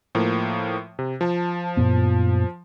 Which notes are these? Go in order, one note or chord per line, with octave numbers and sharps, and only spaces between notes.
A2 F3 A#3
C3
F3 A5
F#2 A#2 B3